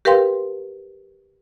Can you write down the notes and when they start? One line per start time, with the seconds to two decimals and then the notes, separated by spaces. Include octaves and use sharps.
0.05 G4 A#4 B4 F5 G5 C6